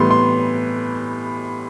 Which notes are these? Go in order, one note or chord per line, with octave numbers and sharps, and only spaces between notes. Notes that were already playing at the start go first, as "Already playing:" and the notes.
Already playing: A2 E3 G3 B3 C6
C6